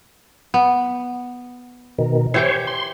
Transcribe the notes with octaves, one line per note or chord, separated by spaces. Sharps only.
B3
B2 D#3
E3 G4 C5 C#5 G5
C6